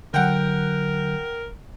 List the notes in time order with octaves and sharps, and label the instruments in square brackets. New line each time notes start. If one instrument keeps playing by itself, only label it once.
[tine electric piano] D3 F#3 [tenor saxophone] A#4 [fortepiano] F#5 G5